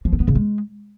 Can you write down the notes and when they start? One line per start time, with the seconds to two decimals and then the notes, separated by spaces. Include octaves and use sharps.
0.05 F3
0.13 C4
0.20 B3
0.28 C#3
0.35 G#3